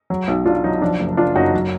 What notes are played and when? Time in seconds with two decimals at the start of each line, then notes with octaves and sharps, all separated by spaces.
0.10 F#3
0.28 B1
0.46 B1 D4 F4
0.64 F#3 D#4
0.81 F3 D4
1.00 F#1
1.17 F#1 D4 F4
1.36 F#2 D#4 F#4
1.54 F#3